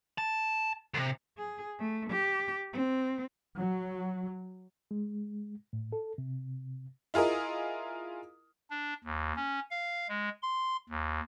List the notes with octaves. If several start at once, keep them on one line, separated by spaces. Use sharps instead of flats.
A5
D2 C3
G#4
A3
G4
C4
F#3
G#3
A2
A4
C3
E4 F4 G#4 A#4 D#5
D4
D#2
C#4
F5
G#3
C6
D#2